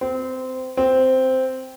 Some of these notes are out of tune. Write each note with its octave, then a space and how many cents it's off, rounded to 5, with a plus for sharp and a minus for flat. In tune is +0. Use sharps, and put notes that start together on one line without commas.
C4 -20
C4 -5